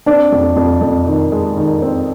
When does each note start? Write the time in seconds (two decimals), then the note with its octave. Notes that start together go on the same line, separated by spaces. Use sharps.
0.06 C4 D4 D5
0.32 F2
0.56 F2
0.81 F2
1.06 D#3
1.32 G#3
1.57 D#3
1.82 C4